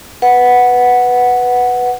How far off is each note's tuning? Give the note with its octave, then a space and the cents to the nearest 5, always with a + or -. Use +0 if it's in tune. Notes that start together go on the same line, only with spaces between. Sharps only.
B4 +0 F#5 +0